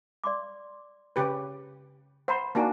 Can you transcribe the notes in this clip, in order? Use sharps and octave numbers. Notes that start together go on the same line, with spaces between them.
D5 C6 D6
C#3 G4 B4
C5 F#5 A#5 B5
A#3 D4 D#4 F#4 G#5 A#5